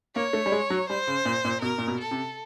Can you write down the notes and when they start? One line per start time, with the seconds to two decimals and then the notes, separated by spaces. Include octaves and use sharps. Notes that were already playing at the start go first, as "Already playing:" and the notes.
0.15 A#3 C#5
0.33 A3
0.46 G3
0.52 G#3
0.70 F#3
0.90 G3 C5
1.07 C#3
1.25 A#2
1.45 A#2
1.62 B2 A#4
1.78 A#2
1.87 B2
2.00 A4
2.11 C3